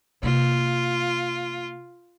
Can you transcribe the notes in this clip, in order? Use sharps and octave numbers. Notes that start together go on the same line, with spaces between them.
C3 A#3 F4